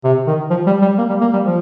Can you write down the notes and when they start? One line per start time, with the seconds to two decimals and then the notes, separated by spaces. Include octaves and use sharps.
0.04 C3
0.27 D#3
0.50 F3
0.67 G3
0.82 G3
0.98 A#3
1.09 G3
1.21 A#3
1.33 G3
1.45 F3